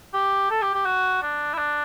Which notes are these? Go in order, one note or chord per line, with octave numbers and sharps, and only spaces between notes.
G4
A4
G4
G4
F#4
D4
E4
D4